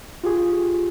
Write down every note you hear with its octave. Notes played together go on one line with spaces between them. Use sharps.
F4 G4 G#4